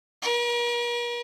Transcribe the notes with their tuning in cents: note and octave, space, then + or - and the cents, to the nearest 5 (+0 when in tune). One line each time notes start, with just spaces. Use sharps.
A#4 +45